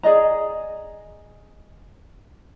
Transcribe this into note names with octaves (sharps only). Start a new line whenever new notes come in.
G#4 D5 D#5 A#5